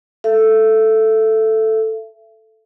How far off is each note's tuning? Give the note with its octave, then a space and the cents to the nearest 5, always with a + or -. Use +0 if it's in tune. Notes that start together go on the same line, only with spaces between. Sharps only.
A4 +0 E5 +30